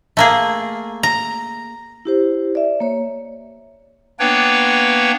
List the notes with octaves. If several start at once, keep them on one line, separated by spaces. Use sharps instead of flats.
A3 A#3 G#4
A#5
E4 G4 C5
D5 E5
A#3 C#5
A#3 B3 D4 B4 C#5 G5